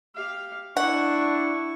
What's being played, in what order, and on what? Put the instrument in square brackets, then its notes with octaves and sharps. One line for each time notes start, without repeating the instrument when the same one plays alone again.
[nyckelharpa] G4 F5
[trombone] D4 [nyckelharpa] E4 C#6 [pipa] F#5